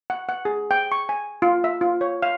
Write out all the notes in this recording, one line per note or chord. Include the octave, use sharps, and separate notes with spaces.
F#5
F#5
G#4
G5
C#6
G#5
F4
E5
F4
C#5
F5